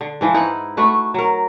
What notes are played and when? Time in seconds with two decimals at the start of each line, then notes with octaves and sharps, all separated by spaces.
0.01 D3
0.21 G#2 E3 F3
0.34 D#4 E4 B4 F#5
0.77 A3 F#4 B4
1.14 F#3 A#4